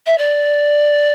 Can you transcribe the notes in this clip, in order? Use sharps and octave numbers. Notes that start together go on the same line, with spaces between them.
E5
D5